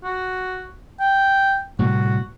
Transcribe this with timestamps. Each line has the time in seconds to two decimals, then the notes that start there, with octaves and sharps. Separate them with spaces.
0.03 F#4
1.00 G5
1.79 A2 C3 G3 F#4